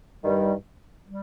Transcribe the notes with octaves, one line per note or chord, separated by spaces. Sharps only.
G2 D#3 G3
G3